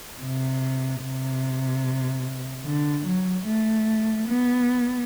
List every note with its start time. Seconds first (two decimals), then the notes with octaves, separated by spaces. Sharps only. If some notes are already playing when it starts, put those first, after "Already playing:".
0.21 C3
1.02 C3
2.65 D3
3.05 F#3
3.46 A3
4.28 B3